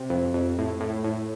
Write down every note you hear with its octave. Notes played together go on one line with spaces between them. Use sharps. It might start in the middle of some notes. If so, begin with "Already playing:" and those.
Already playing: C3
F2
F2
A2
A2
A2